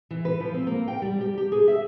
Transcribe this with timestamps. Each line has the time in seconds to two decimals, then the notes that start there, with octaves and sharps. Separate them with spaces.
0.11 E3
0.25 B4
0.40 F3
0.54 C4
0.67 A#3
0.88 G5
1.02 G3
1.21 G4
1.38 G4
1.52 G#4
1.68 E5